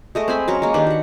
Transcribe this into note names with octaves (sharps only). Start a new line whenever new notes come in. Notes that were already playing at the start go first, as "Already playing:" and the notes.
G#3 A3 D#5
C4 C5 G#5 B5
F#3 C#4 A#4 C#6
G#3 A#3
D#3 D4 G4 B4
F#4 F#5